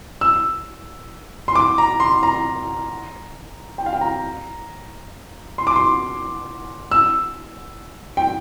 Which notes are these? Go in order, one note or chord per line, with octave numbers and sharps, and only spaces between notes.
E6
C6
D6
A#5
C6
A#5
G5
F5
G5
A#5
C6
D6
C6
E6
G5